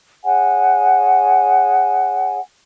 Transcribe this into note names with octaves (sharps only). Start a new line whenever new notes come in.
G#4 C#5 F#5 G#5